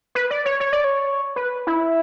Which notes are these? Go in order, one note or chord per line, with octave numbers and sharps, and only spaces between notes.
B4
D5
C#5
C#5
D5
C#5
B4
E4